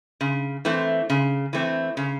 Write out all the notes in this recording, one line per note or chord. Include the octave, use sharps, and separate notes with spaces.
C#3
E3 A3 C4
C#3
E3 A3 C4
C#3